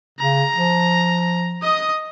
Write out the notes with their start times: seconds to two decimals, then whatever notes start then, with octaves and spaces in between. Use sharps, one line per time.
0.19 C#3 A#5
0.55 F3
1.62 D#5 D#6